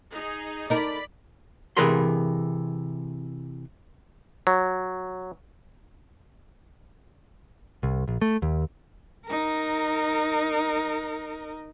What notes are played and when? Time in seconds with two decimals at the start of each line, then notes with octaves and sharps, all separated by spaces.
0.13 D#4 G#4
0.70 D#4 A#4 D5 B5
1.77 C3 E3 G#4 A#4 B5 C6
4.47 F#3
7.83 C2
8.08 A#1
8.22 A3
8.42 D#2
9.26 D#4 A#4